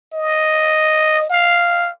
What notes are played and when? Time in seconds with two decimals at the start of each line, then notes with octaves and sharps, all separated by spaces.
0.13 D#5
1.29 F5